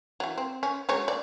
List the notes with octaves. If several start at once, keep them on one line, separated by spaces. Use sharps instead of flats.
E3 F#3
C4
C#4
F#3 G#3 C#5
D5